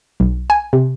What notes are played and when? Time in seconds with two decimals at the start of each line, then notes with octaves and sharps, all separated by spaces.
0.20 B1
0.50 G#5
0.73 C3